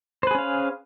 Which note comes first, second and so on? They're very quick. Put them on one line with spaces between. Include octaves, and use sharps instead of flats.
C5 B4 G#4 C#4 F5